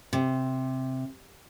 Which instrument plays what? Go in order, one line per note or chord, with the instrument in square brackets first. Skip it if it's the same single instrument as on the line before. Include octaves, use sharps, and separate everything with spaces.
[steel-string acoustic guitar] C3